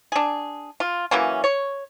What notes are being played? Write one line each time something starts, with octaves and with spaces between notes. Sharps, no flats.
D4 G#4
F4
E3 F#3 A#3 C#4
C#5